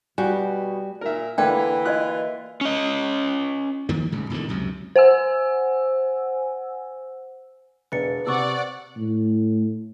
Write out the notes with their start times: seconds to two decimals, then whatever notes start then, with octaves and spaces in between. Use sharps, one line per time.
0.18 B2 G3 F#4 G#5
1.01 A#2 A#4 E5
1.38 D3 E3 A#3 B4 D5 G5
1.85 F4 F#4 D5 D#5 F#6
2.61 C#4 D#5
3.89 G2 D#3 F3 A#3
4.12 D1 G#2 C#3
4.30 A#1 E2 D3 D#3
4.49 C#2 F#2 C3
4.96 C5 F#5 G#5 E6
7.92 E1 B4 A6 C#7
8.26 C3 D5 F#5 C#6 D6 E6
8.97 A2